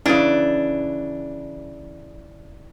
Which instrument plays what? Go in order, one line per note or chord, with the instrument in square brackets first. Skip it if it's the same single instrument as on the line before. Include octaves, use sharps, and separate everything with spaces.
[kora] C#3 E3 [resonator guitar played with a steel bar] D4